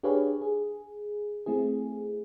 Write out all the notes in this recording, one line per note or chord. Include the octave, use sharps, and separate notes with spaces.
D4 G4 G#4 B4 C#5 F5
G#4
A3 C4 E4 G#4